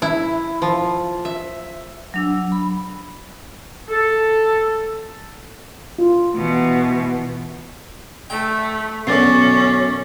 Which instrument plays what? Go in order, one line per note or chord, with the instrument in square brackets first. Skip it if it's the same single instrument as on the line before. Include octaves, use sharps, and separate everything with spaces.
[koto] E4
F3
E5
[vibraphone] F#3 D4 E6
B5
[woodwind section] A4
[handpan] F4
[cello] B2 E3
[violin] A3 [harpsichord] G5
[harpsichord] F#2 D3 [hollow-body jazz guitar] B2 [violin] C#4 [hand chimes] D6 A6 C7